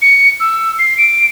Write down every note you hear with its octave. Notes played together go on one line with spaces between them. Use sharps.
C#7
E6
C7
D7